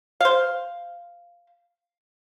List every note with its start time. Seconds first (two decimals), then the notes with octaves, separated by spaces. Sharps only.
0.20 C5 F5